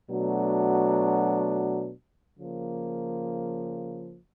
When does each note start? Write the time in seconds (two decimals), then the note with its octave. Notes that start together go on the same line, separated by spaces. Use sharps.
0.11 B2 F#3 A3 D4
2.37 C#3 F3 A#3